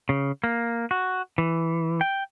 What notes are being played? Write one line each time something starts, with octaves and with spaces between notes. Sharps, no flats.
C#3
A#3
F#4
E3
G5